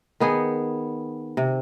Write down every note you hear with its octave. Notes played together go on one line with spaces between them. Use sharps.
D#3 B3 G#4
C3